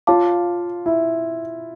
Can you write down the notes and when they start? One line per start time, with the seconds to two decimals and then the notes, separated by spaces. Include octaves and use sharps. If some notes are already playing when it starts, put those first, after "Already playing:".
0.07 F4 C#5 F5 A5 D6
0.86 E4